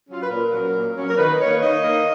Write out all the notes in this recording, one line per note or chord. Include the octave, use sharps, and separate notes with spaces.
F#3 C#4 F4
B4
A#2 A#4
F#3 C#4
A#2
F#3 C#4
A#4
D#3 B4
A#3 D#4 C#5
D#3 D#5
A#3 D#4